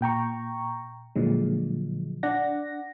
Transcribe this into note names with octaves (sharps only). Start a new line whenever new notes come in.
A#2 G5 A#5 C#6
A#2 D3 F3 F#3 G#3
D4 D5 F#5 A#6